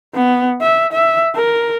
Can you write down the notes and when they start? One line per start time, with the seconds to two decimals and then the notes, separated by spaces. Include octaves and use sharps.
0.15 B3
0.61 E5
0.92 E5
1.35 A#4